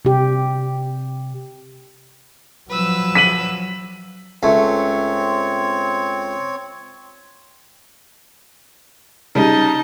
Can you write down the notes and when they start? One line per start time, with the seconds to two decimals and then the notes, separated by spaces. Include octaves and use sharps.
0.05 C3 G4
2.70 F3 F#3 B4 E6
3.15 B6 D#7 F#7
4.43 C#2 A3 C4 C#5
9.35 C#3 G3 D#4 A5